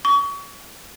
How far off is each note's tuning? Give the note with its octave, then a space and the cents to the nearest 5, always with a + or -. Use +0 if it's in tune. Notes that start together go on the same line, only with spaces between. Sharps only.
C#6 +35